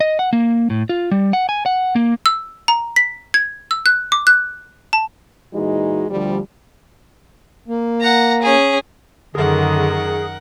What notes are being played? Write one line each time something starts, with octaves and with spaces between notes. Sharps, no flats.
D#5
F#5
A#3
A2
F4
G3
F#5
G#5
F#5
A#3
E6
A#5
B6
G#6
E6
F#6
D6
F#6
A5
A#2 E3 G#3 D#4 F#4
D2 D3 F3 G3
A#3
F#5 A#5
C#4 G#4
F#2 D3 D#3 G#4 A#4 F#5